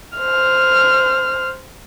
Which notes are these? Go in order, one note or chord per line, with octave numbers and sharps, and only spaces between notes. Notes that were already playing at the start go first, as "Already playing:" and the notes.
C5 F6